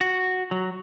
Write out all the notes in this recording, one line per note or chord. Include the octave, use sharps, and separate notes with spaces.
F#4
F#3